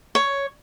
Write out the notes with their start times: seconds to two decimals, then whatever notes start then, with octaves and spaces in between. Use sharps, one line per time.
0.15 C#5